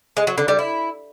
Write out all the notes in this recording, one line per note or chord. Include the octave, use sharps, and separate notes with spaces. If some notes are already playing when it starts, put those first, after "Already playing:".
G#3
F#3
D3
G3
E4